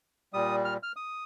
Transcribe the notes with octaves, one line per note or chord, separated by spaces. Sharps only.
A#2 G3 D#6
F6
F6
D#6